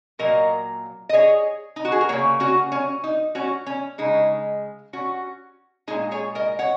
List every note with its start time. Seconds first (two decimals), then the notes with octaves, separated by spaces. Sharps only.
0.19 A#2 F#3 A#3 A#4 D#5
1.09 D#5
1.13 G#4 C#5
1.76 D#4
1.85 F#4
1.92 G#4
2.01 A#4
2.09 C#3 F#3 A#3 G#4 C#5
2.40 C#4 F#4
2.72 C#4
3.04 D#4
3.35 C#4 F#4
3.66 C#4
3.98 C#3 G#3 D#4
4.93 C#4 F#4
5.88 A#2 G#3 D#4 G#4
6.11 G#4 C#5
6.35 A#4 D#5
6.59 C#5 F#5